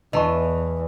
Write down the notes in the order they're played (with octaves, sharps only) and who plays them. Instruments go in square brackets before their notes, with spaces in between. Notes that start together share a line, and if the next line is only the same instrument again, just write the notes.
[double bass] E2 [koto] E3 [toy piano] D#5 A5 C#6